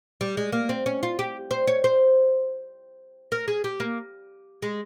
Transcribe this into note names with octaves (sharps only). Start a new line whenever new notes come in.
G3
G#3
A#3
C4
C#4
F4
G4
C5
C#5
C5
A#4
G#4
G4
A#3
G#3